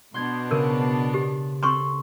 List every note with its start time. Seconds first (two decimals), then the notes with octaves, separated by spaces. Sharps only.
0.14 B2 B3 D4 C6 G6 G#6
0.51 C#3 A#4
1.14 G4
1.63 C4 A4 C6 C#6